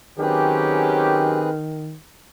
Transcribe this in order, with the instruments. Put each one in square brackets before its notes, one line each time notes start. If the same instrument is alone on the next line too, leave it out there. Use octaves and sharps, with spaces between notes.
[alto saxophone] D#3 [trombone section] F#3 C#4 G4 [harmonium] C4 G#4 B4